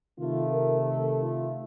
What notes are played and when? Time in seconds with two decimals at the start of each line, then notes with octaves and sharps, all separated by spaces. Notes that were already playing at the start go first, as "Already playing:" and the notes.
0.16 C3 D#3 A3 F4
0.51 A#4
0.86 A4
1.20 F4